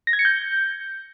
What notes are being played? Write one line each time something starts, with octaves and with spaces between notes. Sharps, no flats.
A#6
G#6
C#7
G6